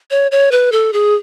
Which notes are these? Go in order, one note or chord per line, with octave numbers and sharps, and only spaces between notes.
C#5
C#5
B4
A4
G#4